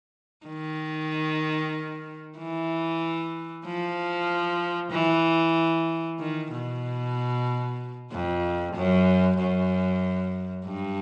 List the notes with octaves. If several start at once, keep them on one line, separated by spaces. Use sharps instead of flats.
D#3
E3
F3
E3
D#3
B2
F2
F#2
F#2
G2